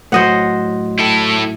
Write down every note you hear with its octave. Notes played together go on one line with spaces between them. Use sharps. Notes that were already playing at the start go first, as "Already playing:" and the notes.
A2 F#3 C5 D#5 F#5
E4 A4